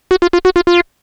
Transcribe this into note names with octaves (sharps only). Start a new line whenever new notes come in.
F#4
F4
F4
F#4
F4
F4